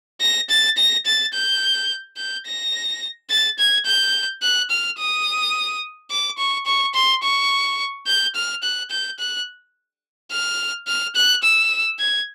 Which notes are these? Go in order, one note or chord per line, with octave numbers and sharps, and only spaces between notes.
A#6
A6
A#6
A6
G6
G6
A#6
A6
G#6
G6
F#6
F6
D#6
D6
C#6
C#6
C6
C#6
G6
F6
F#6
G6
F#6
F6
F6
F#6
E6
G#6